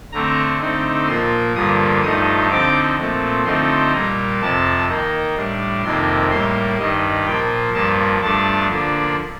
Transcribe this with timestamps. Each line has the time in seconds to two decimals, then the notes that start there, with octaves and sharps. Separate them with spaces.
0.12 D3 A3 C4 A#5
0.60 D3 A3 C4 D#4
1.07 A#2 F3 A#3 C6
1.55 G2 D3 F3 A#3 D#6
2.03 G2 F3 A3 D#4 D#6
2.50 D3 F3 C4 D#4 D6
2.98 A#2 F3 A3 C4
3.45 D3 F3 A3 C4 D#4 C6
3.93 A#2 G3 A#3 A#5
4.40 F2 C3 F3 A5
4.88 D#3 A#3 D#4
5.35 A2 G3 D4
5.83 F2 C3 D#3 A#3 C6
6.30 A2 G3 A#3 C6
6.78 G2 D#3 G3 D#5
7.25 A#2 F3 A#3 G5
7.74 G2 F3 A#3 A5
8.20 G2 F3 A3 D4 A5
8.69 D3 F3 A#3 D4